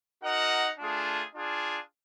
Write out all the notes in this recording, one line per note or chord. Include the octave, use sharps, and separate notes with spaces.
D#4 F#4 A#4 D#5 F#5
A3 D4 F4 G#4
D4 F4 G#4